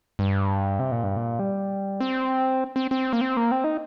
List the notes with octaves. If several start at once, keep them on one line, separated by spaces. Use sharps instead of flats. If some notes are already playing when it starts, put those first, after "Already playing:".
G2
C3
A#2
G2
A#2
G3
C4
C4
C4
A#3
C4
A#3
C4
D#4